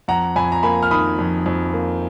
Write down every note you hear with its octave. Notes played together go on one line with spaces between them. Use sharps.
F2 F#5 A#5
F2 G#5 B5
A#5
A#3 G#5 B5
F6
D#3 B5 D#6
F2
F2
A#3